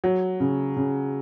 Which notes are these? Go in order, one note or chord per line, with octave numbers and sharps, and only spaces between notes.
F#3
C#3
C#3